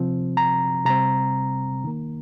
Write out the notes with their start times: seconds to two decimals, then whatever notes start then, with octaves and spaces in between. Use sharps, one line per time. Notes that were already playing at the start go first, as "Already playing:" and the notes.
Already playing: C3 F3 C4
0.37 A#5
0.85 C3 G3 C4 A#5
1.84 D#3 A#3